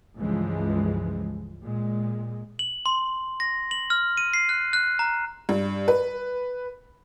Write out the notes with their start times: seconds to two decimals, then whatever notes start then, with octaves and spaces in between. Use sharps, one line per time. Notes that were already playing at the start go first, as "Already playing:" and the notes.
0.18 C#2 G2 E3 F3 G#3
1.63 A#2 G#3
2.59 F#7
2.86 C6
3.40 A#6
3.71 F#7
3.90 F6
4.17 D#7
4.34 C7
4.49 F#6
4.73 F#6
4.99 A#5
5.49 G2
5.88 B4